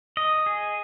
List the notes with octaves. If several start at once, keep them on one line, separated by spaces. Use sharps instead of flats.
D#5
G#4